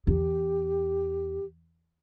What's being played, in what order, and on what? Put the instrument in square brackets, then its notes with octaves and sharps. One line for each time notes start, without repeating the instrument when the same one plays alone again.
[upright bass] E2 [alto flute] G4